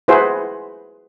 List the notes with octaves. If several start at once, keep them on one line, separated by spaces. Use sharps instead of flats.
E4 F#4 G#4 B4 C5